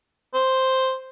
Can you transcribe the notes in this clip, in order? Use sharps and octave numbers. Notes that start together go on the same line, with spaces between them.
C5